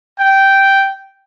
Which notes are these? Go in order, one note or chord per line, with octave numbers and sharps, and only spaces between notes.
G5